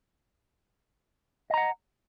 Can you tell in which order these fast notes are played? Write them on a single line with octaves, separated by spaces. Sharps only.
D#5 A#5 F#5